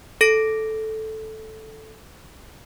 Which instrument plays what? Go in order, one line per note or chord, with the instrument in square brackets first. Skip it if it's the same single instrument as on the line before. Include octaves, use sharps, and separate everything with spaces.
[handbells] A4 A#6 D7